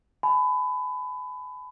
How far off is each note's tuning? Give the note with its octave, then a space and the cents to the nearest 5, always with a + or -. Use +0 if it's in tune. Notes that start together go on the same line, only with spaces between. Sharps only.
G#5 +40 B5 +20